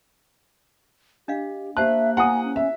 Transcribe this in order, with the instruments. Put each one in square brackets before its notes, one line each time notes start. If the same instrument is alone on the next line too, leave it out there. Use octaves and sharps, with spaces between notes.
[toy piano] D4 D#5 F5 [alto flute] G4
[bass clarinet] A#3 [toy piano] G4 C5 A5 [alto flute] E5 [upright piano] F#6
[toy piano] E4 G4 [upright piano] F#5 D#6 [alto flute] G#5
[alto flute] C#4
[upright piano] E5